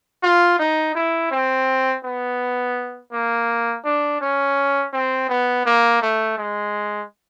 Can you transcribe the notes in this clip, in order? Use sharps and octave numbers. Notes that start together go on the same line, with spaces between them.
F4
D#4
E4
C4
B3
A#3
D4
C#4
C4
B3
A#3
A3
G#3